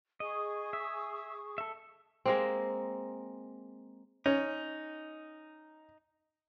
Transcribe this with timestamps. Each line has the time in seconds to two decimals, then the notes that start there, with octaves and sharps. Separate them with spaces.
0.20 G#4 D#5 C#6 D#6
0.73 E5
1.58 A4 E5
2.25 G#3 A#3 C4
4.26 C#4 D#4